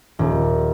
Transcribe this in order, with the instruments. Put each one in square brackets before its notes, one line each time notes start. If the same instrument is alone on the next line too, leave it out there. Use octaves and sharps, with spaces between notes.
[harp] D#1